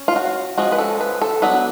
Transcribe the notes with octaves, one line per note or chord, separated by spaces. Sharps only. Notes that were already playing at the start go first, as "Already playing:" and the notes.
Already playing: C#4
F4
F#4
F3 G#3 C#4 F#4
B4
A4
B4
A4
F#3 B3 D4 B4